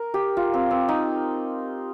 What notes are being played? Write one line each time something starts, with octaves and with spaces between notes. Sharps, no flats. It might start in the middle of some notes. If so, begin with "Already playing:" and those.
Already playing: A#4
G4
F4
C4
C4
D#4